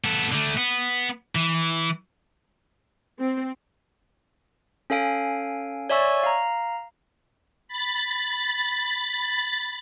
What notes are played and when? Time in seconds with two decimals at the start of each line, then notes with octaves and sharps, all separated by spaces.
0.04 B3 A4
0.32 D3 A3
0.57 B3
1.35 E3
3.19 C4
4.90 C#4 A4 F5 G#5 D7
5.89 C#5 D5 E5 G#5 C#6 E6
6.23 F5 A#5
7.68 B5 A6